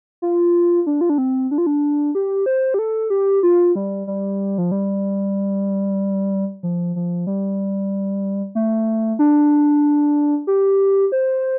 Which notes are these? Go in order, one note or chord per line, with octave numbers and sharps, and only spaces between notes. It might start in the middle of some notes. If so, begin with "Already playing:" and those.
F4
D4
F4
D4
C4
D4
F4
D4
G4
C5
G4
A4
G4
F4
G3
G3
F3
G3
F3
F3
G3
A3
D4
G4
C5